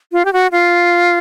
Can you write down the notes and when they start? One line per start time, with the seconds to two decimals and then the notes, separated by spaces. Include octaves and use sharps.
0.12 F4
0.25 G4
0.33 F#4
0.52 F4